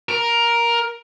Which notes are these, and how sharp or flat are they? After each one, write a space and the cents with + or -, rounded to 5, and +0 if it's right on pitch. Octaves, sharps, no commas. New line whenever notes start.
A#4 +10